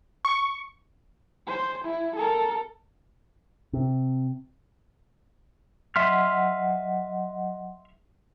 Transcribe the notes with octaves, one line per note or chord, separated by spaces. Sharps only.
C#6
C5
E4
A4 A#4
C3
F#3 D#5 E5 F#5 C6 F6